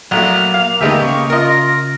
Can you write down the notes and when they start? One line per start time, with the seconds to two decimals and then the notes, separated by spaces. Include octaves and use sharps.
0.11 A#1 F#3 A3 A#3 F#4 F7
0.54 F5
0.81 D2 D#3 G#3 G4 B4 E5
1.01 C#3 A#3 C#6
1.30 F4 A#4 D#5 A#6